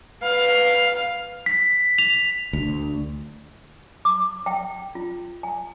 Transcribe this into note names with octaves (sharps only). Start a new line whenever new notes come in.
B4 F5
B6
F7
D2
D6
G5
F4
G#5